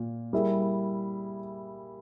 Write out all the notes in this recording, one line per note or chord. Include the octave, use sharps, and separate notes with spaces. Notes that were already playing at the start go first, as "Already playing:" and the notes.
Already playing: A#2
G3 A#3 E4 G#4